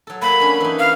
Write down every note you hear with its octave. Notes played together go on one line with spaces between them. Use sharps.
F#3 A4
A#3 B5
C#4 D4
E3 D#4
F5